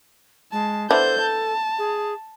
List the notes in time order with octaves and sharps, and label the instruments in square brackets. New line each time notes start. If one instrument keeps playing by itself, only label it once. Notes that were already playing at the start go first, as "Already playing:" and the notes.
[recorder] G#3 [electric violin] A5
[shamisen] B3 D4 E4 [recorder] A4 [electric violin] C5 G6
[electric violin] A5
[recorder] G#4